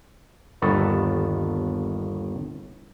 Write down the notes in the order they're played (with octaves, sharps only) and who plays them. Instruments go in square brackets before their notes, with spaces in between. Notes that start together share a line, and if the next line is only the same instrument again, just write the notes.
[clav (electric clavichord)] G1 D#2 D#3 B3 A4 A5